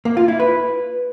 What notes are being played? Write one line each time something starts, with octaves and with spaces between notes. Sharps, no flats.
A#3
F4
E4
B4